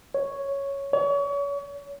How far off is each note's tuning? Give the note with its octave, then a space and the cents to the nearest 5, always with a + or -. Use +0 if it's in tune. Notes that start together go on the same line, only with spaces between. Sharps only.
C#5 +0
C#5 +35